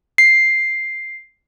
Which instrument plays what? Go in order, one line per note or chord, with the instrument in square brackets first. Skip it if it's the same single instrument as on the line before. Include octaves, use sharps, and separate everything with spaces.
[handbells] C7